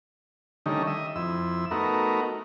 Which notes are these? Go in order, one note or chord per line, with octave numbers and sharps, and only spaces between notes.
D3 D#3 G3 A3 C#4 D#4
D#5 E5
F2 E4 E6
A3 B3 D#4 F#4 A#4